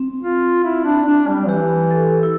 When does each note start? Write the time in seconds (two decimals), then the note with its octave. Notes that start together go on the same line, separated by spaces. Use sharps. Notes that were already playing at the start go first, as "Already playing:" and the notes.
Already playing: C4
0.23 F4
0.65 E4
0.85 D4
1.06 D4
1.28 G3
1.48 E3 G4
1.91 A4
2.23 E4